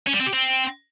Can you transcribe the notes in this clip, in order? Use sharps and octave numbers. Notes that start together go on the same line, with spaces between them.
C#4
G3
C4
G4
C4